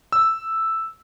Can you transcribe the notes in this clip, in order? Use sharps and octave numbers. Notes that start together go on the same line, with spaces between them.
E6